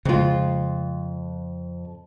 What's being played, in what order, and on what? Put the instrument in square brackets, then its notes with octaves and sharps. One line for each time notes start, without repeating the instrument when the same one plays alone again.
[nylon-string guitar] F2 F4 [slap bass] C#3 G#3